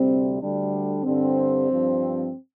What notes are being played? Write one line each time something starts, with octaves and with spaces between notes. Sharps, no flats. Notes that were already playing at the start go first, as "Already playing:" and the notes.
Already playing: D2 C3 G3 C4
D2 D3 G3 D4
G2 D3 G3 C4
G2 F3